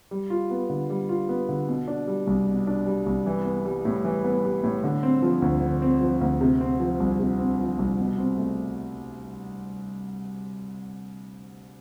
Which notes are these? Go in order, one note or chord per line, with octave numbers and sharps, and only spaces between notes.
G3
F4
B3
D3
G3
F4
B3
D3
B2
D4
G3
C2
B2
D4
G3
C2
E3
B3
G3
A2
E3
B3
G3
A2
D3
C4
F3
D2
D3
C4
F3
D2
C3
C4
F3
C2
C3
C4
F3
C2
B2
C4
A3